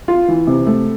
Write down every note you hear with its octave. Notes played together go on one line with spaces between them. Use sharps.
F4
E3
C3
A3